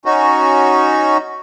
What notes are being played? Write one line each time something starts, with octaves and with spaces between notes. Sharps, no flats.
C#4 D#4 F#4